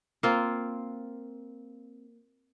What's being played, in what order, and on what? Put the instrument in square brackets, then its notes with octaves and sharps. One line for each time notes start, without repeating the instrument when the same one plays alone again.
[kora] A#3 C4 F4